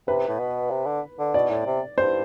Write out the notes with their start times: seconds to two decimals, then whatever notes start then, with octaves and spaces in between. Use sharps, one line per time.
0.08 C3 B4
0.29 A2
0.40 B2
0.71 C3
0.86 D3
1.19 D3
1.34 B2 D5
1.51 A2
1.66 C3
1.98 G2 C5